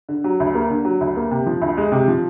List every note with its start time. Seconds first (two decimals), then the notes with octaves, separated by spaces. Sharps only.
0.09 D3
0.24 F#3
0.40 D2
0.54 A#3
0.70 D3
0.85 F#3
1.01 D2
1.16 A#3
1.31 C3
1.46 F3
1.62 D2
1.77 G#3
1.92 C3
2.08 F3